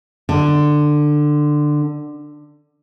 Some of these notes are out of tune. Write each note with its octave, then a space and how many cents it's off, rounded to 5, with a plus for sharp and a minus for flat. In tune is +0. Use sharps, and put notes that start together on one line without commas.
D3 +15